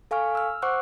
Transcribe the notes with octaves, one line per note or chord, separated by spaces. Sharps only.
A4 F5 G#5 C#6 F6
E6 F6
C5 F#5 C#6 D6 E6 F#6